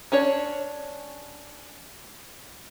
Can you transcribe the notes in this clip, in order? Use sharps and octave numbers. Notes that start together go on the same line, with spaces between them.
C#4 D4 C#5